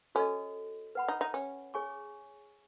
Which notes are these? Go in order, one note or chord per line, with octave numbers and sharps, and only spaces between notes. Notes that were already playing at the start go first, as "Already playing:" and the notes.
C#4 F#4 A4 D#5
B4 F#5 B5
D#4
D#4
C#4
G#4 C#5 G#5 C#6